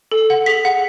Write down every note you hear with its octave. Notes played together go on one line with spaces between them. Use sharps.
A4
F#5
G#4 B6
F#5